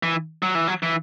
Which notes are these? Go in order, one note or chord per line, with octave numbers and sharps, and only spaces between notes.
E3
F#3
E3
F#3
E3